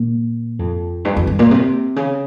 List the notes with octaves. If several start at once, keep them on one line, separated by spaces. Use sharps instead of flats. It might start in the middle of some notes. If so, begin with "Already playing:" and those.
Already playing: A#2
F2
G2
F2
G2
A#2
C3
C#3